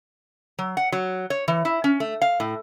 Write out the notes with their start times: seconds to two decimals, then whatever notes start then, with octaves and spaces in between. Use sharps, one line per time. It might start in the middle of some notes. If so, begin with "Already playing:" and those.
0.59 F#3
0.77 F#5
0.92 F#3
1.30 C#5
1.48 E3
1.65 E4
1.84 C#4
2.00 A3
2.22 F5
2.40 A2